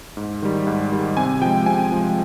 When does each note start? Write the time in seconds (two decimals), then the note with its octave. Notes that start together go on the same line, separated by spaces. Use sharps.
0.17 G#2
0.42 D#3 G3
0.67 G#2
0.92 D#3 G3
1.17 C3 G#5
1.42 F3 G5
1.45 G#3
1.66 C3 G#5
1.92 F3 G#3